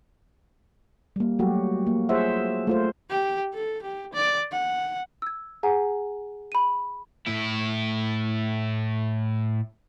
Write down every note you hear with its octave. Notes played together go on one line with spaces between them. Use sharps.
G3 A#3
F#3 G3 A3 F#4 G4
A#3
F4 G#4 C5 C#5 E5 F#5
A3 F4 C5
G4
A4
G4
D5
F#5
E6 G#6
G#4 F#5 G#5 A#5
B5 D#7
A2 E4